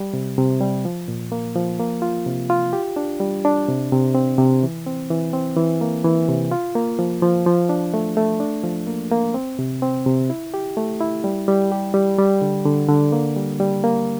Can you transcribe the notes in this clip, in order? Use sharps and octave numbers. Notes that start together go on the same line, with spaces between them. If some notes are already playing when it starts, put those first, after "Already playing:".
Already playing: G3
C3
C3
G3
F3
A#2
A#3
F3
A#3
F4
C3
F4
G4
D4
G3
D4
C3
C3
C4
C3
E3
C4
E3
C4
E3
A#3
E3
C3
F4
A#3
F3
F3
F3
D4
A3
A3
D4
F3
A#3
A#3
C4
C3
C4
C3
E4
G4
A3
E4
G3
G3
G4
G3
G3
D3
D3
D3
A#3
G3
G3
A#3